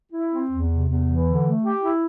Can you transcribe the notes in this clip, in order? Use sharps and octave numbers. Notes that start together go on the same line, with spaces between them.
E4
C4
E2
C3
E2
E3
D3
A3
G4
E4